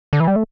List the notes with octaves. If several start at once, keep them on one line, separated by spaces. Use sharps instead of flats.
D3
E3
G3
A3